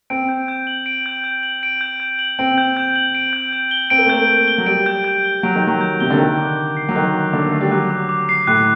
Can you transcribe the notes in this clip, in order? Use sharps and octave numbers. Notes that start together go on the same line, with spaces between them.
C4 D7
G6
G6
F#7
D7
G6
G6
F#7
D7
G6
G6
F#7
C4 D7
G6
G6
F#7
D7
G6
G6
G7
C4 D7
A#3
A3
A#3 G6
G6
G7
F#3
G3 D7
G6
G6
G7
F#3 D7
D#3
G6
F#3
G6
C3 G7
D3
D#3 F#6
D6
D6
C7
F#3
D#3 F#6
D6
D3 D6
A3 C7
G3
F#3 F#6
D6
D6
C7
A2 F#6